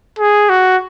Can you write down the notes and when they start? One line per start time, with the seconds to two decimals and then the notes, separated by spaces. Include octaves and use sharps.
0.19 G#4
0.49 F#4